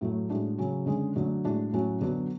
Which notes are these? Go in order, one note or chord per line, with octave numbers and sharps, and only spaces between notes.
A2 F#3 A3
A2 G#3 D4 F#4
C#3 F#3 C#4
D3 G#3 C#4
D3 F#3 A3
A2 G#3 D4 F#4
A2 F#3 C#4 F#4
D3 F#3 B3 D4 F#4